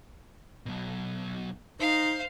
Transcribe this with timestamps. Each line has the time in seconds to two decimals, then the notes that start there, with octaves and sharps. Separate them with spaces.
0.66 B1 B2
1.80 D#4 C5 F5